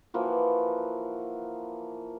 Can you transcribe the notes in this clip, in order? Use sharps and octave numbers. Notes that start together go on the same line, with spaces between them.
E3 F3 A#3 F#4